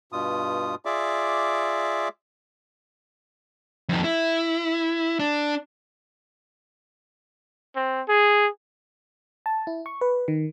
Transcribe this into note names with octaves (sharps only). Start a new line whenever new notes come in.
G2 B2 F4 D#6
F4 G#4 D5 E5 D6
F2 D#3
E4
D4
C4
G#4
A5
E4
C#6
B4
D#3